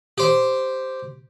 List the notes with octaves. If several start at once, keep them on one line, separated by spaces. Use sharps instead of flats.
G4 C5